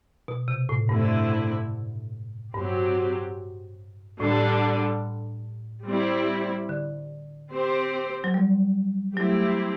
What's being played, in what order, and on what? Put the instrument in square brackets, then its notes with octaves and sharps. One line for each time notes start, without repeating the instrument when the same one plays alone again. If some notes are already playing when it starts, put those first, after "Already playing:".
[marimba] B2
C3
A2
[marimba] G2 [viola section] D3 A3 C4 E4
[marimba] G2 [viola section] F#3 C4 G4
[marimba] A2 [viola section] D3 G3 D4 A4
[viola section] G3 C4 E4
[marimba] D3
[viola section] C4 G4 C5
[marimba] F#3
G3
[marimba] F#3 [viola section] A3 C4 E4 G4